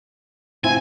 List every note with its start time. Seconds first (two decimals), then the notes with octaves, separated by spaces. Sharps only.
0.64 C4 E4 F4 G#5